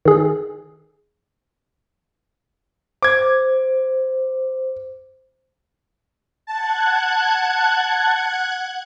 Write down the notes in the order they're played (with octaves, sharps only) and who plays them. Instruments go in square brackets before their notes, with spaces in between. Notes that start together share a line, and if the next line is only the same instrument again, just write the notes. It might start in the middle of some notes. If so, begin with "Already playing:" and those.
[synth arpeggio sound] D#3 G#4
[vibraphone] C5 [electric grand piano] D6 G#6
[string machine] F#5 F#6 G#6 [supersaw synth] A5